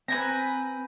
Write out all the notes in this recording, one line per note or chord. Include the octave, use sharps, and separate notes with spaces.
C4 B4 G#5 A#5